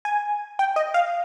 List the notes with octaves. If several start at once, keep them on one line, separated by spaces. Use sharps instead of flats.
G#5
G5
D#5
F5